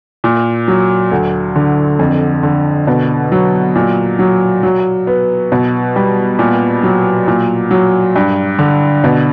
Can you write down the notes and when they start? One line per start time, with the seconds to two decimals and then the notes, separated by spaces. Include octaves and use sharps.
0.24 A#2
0.68 F#3
1.12 D2
1.56 D3
1.99 F2
2.43 D3
2.87 B2
3.32 F#3
3.75 A#2
4.19 F#3
4.63 F#3
5.07 B3
5.52 B2
5.96 G3
6.39 A#2
6.83 F#3
7.28 A#2
7.71 F#3
8.16 G2
8.59 D3
9.04 B2